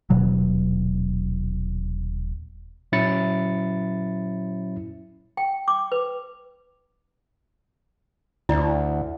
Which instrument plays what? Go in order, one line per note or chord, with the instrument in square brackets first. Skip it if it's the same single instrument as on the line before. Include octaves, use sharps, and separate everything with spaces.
[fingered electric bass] D#1 B2 F#3
[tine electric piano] A#2 F#3 C#4 E4 A6 C#7
[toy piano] G5
D6
B4
[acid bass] D2 [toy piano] E4 D5